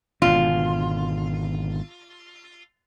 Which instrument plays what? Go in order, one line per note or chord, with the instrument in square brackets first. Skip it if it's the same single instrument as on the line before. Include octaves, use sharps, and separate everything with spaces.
[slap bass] G#1 B2 D3 [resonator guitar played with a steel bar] F4